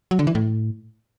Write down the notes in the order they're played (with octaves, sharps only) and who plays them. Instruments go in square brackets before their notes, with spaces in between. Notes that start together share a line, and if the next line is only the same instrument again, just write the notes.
[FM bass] F#3
D3
E3
A2